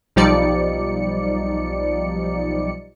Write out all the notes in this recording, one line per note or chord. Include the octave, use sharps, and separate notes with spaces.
B1 F3 G3 D#4 D5 C#7